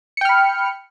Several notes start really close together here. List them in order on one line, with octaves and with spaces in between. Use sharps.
C#7 G5 F6 B5